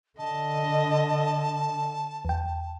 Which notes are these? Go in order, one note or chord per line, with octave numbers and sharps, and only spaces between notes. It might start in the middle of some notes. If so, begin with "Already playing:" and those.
D3 D#5 A5
E2 G5